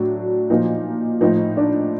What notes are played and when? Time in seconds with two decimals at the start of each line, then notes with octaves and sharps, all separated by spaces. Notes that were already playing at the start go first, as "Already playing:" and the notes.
Already playing: A2 F#3 D4
0.50 A#2 F3 D#4
1.21 A2 F3 D#4
1.57 D4